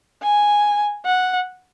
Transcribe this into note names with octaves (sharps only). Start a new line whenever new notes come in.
G#5
F#5